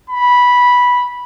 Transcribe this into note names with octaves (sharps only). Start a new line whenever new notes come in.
B5